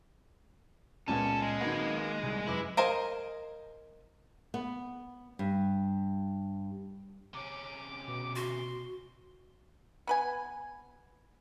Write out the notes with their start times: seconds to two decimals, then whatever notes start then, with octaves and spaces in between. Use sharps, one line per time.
1.08 C#2 A#2 B3 C#4 A4
1.42 G#3
1.61 D#3 A#3 F#4 B4
2.23 C2
2.47 F#2 E4 B4 D6
2.77 A#4 C5 D#5 F5 G#5
4.54 B3
5.39 G2
7.34 C3 C#4 D6
8.08 B2
8.36 F#4 C6
10.07 B3 B4 G#5